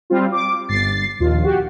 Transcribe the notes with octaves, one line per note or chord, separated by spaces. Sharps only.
G3 C4 F4
D6
G1 A6 C7
A#1 D#2 F4
F#4 G4